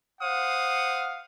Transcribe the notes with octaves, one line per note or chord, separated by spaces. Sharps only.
C5 F5 F#5 D#6